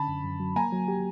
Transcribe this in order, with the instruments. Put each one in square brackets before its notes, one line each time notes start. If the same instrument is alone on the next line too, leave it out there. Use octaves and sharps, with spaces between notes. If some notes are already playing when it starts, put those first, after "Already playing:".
Already playing: [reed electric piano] D3 C#4 [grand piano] A5 B5
[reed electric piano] F#2
F#2
F#3
[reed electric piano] A#3 [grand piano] G#5 A#5
[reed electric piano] F#3
G4